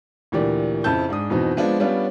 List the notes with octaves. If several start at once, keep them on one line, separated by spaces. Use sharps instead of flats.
D2 A#2 E3 G4 D5
F2 C#3 C4 E4 A5 G6
G#2 D4 G#4 D#6
F2 B2 E3 C4 D#4
F3 G#3 B3 C4 D4 F4
G3 B3 C#4 D4 F4